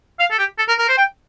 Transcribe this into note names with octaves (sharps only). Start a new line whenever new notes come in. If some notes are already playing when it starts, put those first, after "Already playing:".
F5
A4
G4
A4
A#4
A#4
C5
G5